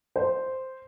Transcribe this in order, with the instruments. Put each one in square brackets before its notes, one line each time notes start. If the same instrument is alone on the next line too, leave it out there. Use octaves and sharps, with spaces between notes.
[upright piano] C5